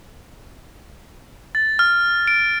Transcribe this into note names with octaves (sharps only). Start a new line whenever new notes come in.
A6
F6
D7